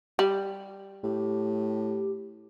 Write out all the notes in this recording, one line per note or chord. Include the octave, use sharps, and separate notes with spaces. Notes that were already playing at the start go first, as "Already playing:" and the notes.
G3
A2 G4